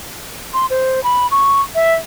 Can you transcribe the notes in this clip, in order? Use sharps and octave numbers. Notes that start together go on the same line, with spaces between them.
C6
C5
B5
C#6
E5